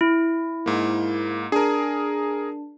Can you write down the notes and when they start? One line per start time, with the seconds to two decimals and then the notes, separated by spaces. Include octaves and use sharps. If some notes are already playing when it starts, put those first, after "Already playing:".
0.01 E4
0.66 G#2 A#3
1.52 D4 G#4 A#4